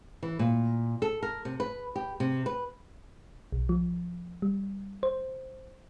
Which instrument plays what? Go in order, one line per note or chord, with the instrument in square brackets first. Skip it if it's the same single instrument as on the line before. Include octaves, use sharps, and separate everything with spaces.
[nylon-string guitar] E3
A#2
A4
A#4
C3
B4
G4
C3
B4
[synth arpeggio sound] B1
F3
G3
C5